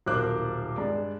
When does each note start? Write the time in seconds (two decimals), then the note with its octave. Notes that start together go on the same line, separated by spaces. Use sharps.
0.06 D#1 B1 A#4 C5 D6 F#6
0.76 G2 G#3 D5